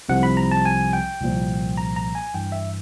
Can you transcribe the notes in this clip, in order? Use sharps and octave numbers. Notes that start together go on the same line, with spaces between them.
C2 C3 F3 F#5
B5
A#5
A5
G#5
G5
C2 A#2 F3
A#5
A#5
G#5
G2 E3 G5
E5